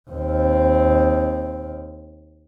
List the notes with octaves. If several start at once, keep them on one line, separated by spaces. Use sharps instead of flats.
D#2 C4